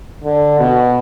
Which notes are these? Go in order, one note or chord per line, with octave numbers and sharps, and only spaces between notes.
D3
B2